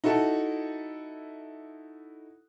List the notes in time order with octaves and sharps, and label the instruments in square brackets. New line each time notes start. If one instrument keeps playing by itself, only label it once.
[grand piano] D#4 E4 F#4 A4